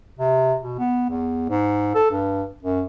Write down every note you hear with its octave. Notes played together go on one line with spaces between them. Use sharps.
C3
B2
B3
E2
G#2
A4
G2
F#2